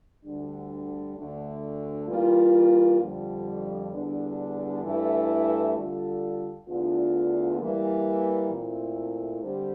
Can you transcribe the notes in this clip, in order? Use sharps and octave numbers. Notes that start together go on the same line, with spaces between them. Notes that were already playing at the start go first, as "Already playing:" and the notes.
D2 D3 G3 D4
D2 D3 A3
E3 G3 A#3 F4
F2 D3 G3
E2 D3 G3 D4
G2 E3 A3 E4 A4
D3 G3 D4 F4 A4
E2 D3 A3 D4 F4
E3 G3 A#3
A#2 A3 C4 E4 A4
D3 G3 C4 G4 C5